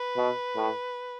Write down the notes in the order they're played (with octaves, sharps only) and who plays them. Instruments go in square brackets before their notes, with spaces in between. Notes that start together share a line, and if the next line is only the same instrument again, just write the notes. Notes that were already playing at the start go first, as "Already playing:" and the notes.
Already playing: [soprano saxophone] B4
[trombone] B2
A2